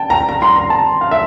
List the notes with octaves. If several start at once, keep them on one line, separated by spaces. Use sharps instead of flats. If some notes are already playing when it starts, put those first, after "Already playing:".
Already playing: G5 A5
A#5
A#5
C6
A#5
A5
F5
E5